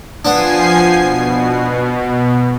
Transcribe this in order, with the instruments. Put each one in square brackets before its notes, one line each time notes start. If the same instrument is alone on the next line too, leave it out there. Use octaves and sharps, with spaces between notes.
[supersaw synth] F3 G#5 C7 [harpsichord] B3 D4
[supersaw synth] B2